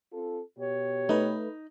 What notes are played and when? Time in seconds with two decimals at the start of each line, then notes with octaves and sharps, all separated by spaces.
0.12 C4 F4 A4
0.58 B2 G4 C#5
1.09 A3 D#4 B4